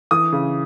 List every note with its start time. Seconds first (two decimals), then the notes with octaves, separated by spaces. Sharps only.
0.11 E3 D#6
0.32 C#3